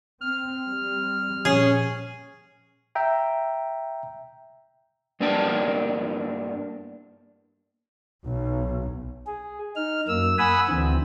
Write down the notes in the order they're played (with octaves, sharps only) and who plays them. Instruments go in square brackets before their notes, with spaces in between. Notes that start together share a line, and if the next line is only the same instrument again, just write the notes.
[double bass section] C4 [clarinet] F6
[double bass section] G3 C4
[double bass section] A#2 F3 [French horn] C#4 [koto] G#4
[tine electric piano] E5 G5 A#5
[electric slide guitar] G2 A#3 B3 D4 G5 A5
[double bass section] B1
[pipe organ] G#4
D#4 F6
F#2 A#3 E6
F#5 G#5 B5 D#6 E6
D2 D3 E3 C4